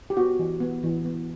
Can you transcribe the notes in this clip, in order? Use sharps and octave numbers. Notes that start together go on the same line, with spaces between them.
G4
B3 F#4
E3
B3
E3
B3